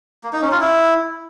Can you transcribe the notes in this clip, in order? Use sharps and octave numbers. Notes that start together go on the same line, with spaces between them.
A#3
D#4
C#4
F4
E4